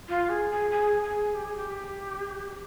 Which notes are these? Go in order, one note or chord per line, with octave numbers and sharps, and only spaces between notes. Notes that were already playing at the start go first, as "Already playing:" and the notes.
F4
G#4
G#4
G#4
G#4
G4
G#4
G4